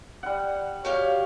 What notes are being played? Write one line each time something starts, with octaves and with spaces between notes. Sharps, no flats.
G3 F#5
F#4 G4 C#5 F5